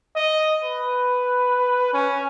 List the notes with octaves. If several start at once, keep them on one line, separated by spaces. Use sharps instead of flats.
D#5
B4
C#4